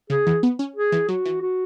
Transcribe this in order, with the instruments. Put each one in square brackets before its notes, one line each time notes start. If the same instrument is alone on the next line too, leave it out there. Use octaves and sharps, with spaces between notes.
[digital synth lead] C#3 [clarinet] G#4
[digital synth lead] E3
B3
C#4
[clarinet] G#4
[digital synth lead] E3
[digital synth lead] F#3 [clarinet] F#4
[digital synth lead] E3
[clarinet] F#4